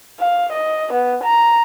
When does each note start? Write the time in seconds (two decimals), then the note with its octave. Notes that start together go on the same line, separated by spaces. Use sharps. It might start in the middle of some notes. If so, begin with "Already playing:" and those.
0.19 F5
0.52 D#5
0.93 B3
1.23 A#5